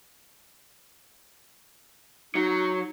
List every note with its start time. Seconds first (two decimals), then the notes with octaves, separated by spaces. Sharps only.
2.35 F#3 D#4